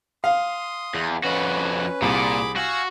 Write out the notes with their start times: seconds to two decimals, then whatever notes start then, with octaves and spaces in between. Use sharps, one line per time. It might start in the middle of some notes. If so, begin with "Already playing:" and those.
0.24 F5 C6 D#6
0.94 E2
1.24 F2 C#4 F#4 B4
2.02 C2 A#2 G#4 B5 D6
2.57 F#4 F5 G#5 E6